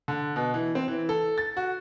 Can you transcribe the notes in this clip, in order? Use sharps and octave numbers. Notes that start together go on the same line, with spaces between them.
D3
B2
E3
C4
E3
A4
A6
F#4